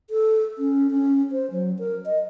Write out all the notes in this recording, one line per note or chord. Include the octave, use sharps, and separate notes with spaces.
A4
C#4
C#4
C5
F#3
A#4
D#5